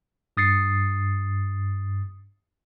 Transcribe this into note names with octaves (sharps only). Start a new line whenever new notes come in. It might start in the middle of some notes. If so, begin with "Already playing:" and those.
G2 D#6 A6 C7 C#7